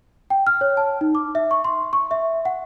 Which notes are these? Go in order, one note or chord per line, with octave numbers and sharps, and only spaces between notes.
G5
F6
C#5
A5
D#4
D6
E5
C#6
C6
C#6
E5
F#5